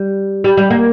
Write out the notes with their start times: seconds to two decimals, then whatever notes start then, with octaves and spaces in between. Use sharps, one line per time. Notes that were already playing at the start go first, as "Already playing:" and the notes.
Already playing: G3
0.44 G3
0.57 G3
0.70 A#3